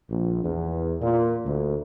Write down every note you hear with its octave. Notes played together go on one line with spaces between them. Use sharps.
A#1
E2
A#2
D2